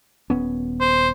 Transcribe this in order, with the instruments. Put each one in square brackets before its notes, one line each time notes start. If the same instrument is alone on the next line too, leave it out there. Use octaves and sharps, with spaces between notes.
[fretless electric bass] D#1 B3 C#4
[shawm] C5